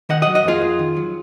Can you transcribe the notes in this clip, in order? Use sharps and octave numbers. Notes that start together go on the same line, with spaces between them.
D#3 D#5 F#5
D#5 F#5
F#3
D#5 F#5
F2 F4 G#4
F2
D#3
F#3